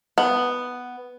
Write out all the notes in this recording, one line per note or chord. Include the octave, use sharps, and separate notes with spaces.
B3